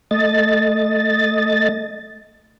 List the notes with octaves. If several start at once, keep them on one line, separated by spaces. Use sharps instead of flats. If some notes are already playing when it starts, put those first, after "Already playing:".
A3 D#5 A6